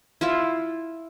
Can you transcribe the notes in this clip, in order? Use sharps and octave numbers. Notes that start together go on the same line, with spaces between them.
E4 F4 E5